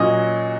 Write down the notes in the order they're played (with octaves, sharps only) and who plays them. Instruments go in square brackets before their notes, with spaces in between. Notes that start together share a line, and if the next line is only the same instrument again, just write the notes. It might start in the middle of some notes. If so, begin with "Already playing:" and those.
Already playing: [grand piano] A#2 F#3 C#4 D#5